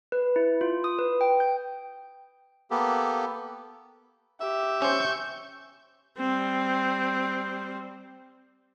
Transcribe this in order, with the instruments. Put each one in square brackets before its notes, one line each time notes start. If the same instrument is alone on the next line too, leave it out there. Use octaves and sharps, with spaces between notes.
[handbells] B4
E4
F4
D#6
B4
G5
G6
[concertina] A#3 B3 G4 A4
[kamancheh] G4 [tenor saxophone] E5
[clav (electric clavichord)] C#4 C5 [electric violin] C#6 G6
[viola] G3 C4